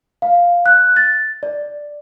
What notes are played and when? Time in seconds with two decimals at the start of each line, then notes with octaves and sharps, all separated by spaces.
0.22 F5
0.66 F#6
0.96 A6
1.43 D5